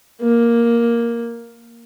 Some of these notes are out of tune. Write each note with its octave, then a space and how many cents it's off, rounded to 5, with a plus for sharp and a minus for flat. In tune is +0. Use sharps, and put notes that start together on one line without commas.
A#3 +5